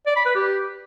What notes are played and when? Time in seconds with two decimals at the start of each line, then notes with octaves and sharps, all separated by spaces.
0.07 D5
0.16 B5
0.26 B4
0.35 G4